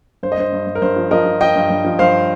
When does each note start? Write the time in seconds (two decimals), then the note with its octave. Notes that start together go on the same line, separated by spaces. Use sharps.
0.23 G2 C5
0.32 D#5
0.38 G2 C5
0.53 G2
0.67 G2
0.75 A#4
0.82 G2 C5
0.96 F3
1.11 F3 A#4 D#5
1.26 F3
1.41 F3 D#5 G5
1.56 G2
1.70 G2
1.85 F3
1.99 G2 C5 F5